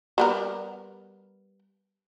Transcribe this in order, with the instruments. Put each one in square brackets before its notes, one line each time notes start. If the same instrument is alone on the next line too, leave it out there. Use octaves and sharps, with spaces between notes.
[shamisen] G3 B3 A#4